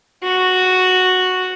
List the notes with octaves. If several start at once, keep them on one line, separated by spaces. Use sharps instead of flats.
F#4